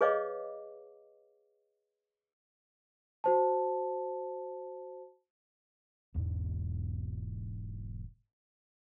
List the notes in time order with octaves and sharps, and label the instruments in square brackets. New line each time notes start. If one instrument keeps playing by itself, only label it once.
[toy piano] G#4 B4 C#5 D#5 F5 D6
[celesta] F#4 C5 A5
[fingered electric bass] E1 E2 G#2 B2